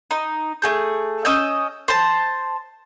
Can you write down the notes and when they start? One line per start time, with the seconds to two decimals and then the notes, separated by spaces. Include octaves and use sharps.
0.11 D#4
0.62 A3 G#4 G6
1.25 C#4 D#5 E6 G6
1.88 C5 A5